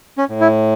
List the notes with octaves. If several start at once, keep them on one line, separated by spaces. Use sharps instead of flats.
C#4
A2
E4